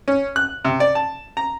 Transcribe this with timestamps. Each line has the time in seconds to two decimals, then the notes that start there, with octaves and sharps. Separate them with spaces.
0.08 C#4
0.36 F#6
0.65 C3
0.80 D5
0.95 A5
1.37 A#5